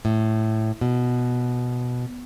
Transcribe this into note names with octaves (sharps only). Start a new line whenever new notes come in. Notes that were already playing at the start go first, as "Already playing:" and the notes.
A2
B2